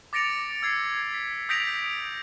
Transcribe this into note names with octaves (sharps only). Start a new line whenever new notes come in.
D6 A6 A#6 C#7 D7 F7
E6 G#6 C7
B6
D#6 G6 A#6 B6 D7 F7